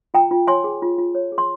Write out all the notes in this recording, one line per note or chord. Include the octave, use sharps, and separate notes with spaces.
F4 G5 A#5
F4
C#5 G#5 C6
G#4
F4
F4
C#5
G#4
C6